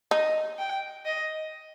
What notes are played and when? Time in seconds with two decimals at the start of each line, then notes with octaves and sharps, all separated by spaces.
0.11 D#4 D#5
0.59 G5
1.06 D#5